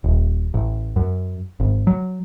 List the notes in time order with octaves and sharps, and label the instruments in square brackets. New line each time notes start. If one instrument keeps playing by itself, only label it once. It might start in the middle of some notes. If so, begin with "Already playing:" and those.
[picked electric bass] D#1
A1
F#2
G#1
F#3